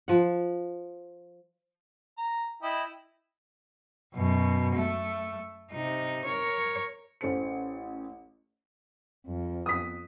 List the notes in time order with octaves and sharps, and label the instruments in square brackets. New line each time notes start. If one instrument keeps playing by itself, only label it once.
[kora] F3 F#5
[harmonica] A#5
E4 D#5 G5
[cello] F#2 B2
A3
C3 D#4
A#4 C#5
[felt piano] A1 C#4 A4 C5 C#7
[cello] F2
[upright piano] D#6 B6